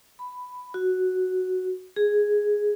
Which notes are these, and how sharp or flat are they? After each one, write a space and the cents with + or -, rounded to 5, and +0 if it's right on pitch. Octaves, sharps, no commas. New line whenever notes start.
B5 +10
F#4 +0
G#4 +0